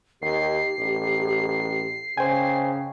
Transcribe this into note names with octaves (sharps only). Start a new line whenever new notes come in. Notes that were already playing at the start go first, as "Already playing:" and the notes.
D#2 G4 C7
A1
C#3 C5 G5 G#5